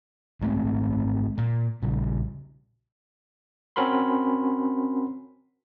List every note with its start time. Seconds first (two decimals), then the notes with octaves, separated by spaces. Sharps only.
0.41 G#1 G#3 A3 C4
1.38 A#2
1.82 A#1 C#3 G3
3.76 C4 C#4 F#4 A#4 B5 C6